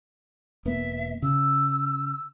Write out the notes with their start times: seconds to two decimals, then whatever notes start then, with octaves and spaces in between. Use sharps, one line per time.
0.65 E1 A#3 B3 E5
1.22 C#3 E6